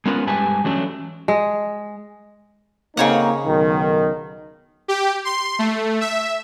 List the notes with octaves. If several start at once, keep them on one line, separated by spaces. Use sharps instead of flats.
G#3 B3 C#4 F4 A#4 B4
G2 G3 G#3 B4 G#5 A5
E3 F#3 A3 C#4 D4
G#3
C#3 A#3 C4 D#4 C#5 F#5
B1 D#3
G4
C6
A3
E5